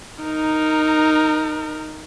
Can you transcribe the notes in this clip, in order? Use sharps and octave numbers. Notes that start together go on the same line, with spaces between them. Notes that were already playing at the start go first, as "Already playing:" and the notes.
D#4 A#4